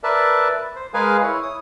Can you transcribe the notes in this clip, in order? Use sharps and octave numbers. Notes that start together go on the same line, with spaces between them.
A#4 B4 D5 E5 A5
C5
G#3 G#4 A#4 B4 F5 G#5
E4 C#5
D#6